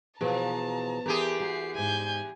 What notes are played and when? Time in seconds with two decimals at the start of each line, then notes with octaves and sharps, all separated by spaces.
0.21 B2 E3 F3 G#4 A5 A#5
1.06 E2 G4 G#4 A#4
1.40 F#4 A#4 C7
1.75 F2 G#2 G#5 G6